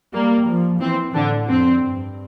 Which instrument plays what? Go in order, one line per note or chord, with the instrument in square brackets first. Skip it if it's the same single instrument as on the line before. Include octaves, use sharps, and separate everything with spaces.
[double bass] G3 [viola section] A#3
[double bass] F3
[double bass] E3 [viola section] C4
[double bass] A2 [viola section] D3 D4
[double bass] F2 [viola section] C4
[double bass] G2